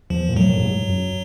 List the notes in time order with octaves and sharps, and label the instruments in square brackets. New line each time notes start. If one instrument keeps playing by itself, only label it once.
[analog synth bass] E2 [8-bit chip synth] F3
[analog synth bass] A#2
[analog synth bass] A2 [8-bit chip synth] F#3
[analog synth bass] A#2
G2
G#2
F#2